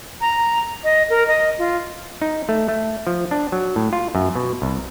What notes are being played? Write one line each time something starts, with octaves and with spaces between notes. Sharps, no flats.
A#5
D#5
A#4
D#5
F4
D#4
A3
A3
F3
D4
F#3
A2
F4
F#2
B2
C2